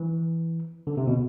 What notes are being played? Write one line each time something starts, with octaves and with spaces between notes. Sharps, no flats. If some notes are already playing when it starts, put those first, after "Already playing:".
Already playing: E3
D3
C3
B2